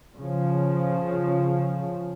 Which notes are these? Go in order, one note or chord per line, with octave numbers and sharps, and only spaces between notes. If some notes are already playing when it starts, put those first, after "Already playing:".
C#3 F3